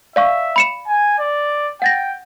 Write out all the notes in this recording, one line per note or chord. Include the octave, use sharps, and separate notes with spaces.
D5 E5 F5 C#6
B5 C#7 E7
G#5
D5
F#5 G5 A6 A#6